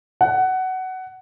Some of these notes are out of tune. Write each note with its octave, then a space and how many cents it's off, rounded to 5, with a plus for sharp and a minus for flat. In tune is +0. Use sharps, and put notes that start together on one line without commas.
F#5 +15